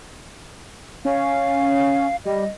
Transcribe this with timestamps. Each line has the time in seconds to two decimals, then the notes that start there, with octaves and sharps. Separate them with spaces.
1.05 C#4 F5
2.25 G3 D#5